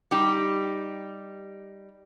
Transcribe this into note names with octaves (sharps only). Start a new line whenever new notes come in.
G3 D#4 G4